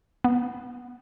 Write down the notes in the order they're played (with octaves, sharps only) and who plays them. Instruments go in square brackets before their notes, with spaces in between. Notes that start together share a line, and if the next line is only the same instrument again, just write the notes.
[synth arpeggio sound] B3